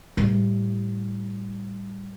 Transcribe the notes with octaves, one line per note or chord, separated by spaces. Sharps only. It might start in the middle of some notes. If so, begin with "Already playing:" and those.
A2 G3